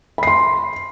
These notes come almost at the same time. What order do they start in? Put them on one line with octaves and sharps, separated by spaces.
B5 C7 C6